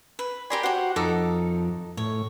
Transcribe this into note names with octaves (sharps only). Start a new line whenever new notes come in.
B4
G4 A#4 D5 G#5 B5 C6
F#4 G4 C5 F#5
F2 D#4 A4 D6
A2 C#5